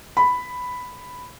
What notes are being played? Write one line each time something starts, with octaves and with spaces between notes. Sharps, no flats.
B5